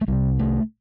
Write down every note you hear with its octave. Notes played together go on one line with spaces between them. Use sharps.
A3
C2 C3 G3
A3